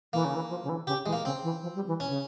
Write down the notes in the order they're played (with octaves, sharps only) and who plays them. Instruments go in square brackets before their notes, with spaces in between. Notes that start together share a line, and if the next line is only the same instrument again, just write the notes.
[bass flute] E3 [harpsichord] A#3
[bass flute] C#3
E3
F3
C#3
E3
[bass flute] C#3 [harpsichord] G4
[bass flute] E3 [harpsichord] G#3
[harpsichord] A#3
[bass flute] C#3 [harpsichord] C4
[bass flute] E3
F3
G3
E3
[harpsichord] C#4
[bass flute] C#3